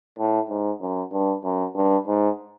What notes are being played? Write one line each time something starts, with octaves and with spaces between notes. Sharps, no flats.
A2
G#2
F#2
G2
F#2
G2
G#2